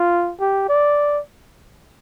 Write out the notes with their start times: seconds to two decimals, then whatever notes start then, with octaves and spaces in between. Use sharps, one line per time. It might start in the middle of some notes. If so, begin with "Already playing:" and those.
Already playing: F4
0.40 G4
0.69 D5